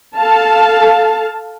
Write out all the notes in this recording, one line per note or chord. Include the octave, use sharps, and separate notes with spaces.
A4 F5 A5